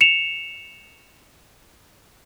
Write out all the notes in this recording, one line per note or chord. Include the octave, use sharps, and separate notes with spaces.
C#7 E7 F7